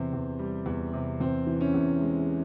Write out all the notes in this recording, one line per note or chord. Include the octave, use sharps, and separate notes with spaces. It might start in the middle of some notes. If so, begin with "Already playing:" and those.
Already playing: E2 C3 C4
E2
G3
E2
C3
E2 C4
E3
C#4
E2
G#3